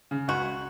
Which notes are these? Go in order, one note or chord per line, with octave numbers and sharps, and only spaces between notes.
C#3
C#2 F#4